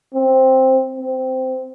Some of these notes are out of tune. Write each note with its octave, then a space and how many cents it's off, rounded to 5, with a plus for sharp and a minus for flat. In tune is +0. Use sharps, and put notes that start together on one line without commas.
C4 +5
C4 -15